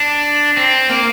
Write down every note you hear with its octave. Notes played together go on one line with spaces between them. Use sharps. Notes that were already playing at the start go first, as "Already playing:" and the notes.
Already playing: D4
C4
A#3